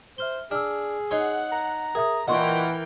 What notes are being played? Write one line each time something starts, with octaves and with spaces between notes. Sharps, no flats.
C5 E5 F6 G7
D4 G#4 E6 F6
D#4 C#5 F#5 C6
A#5
G#4 A#4 E5 D#6
A#2 E3 A#4 D#5 F#5 G5 C6 C#6